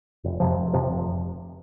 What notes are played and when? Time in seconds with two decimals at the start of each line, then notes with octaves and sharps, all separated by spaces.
0.24 F1
0.40 F2 C3 F3
0.57 F1
0.73 F2 C3 F3
0.91 F1